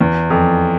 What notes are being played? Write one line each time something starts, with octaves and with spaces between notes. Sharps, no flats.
E2
F2